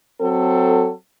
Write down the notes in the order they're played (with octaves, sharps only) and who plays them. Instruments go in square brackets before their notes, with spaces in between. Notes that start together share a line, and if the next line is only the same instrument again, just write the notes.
[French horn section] F#3 C4 A4